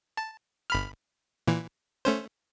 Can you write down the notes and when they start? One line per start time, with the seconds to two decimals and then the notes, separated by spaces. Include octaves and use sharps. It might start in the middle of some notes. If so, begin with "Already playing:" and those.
0.17 A5
0.70 G1 B5 F6
1.47 A#2 E3
2.05 A3 C#4 C5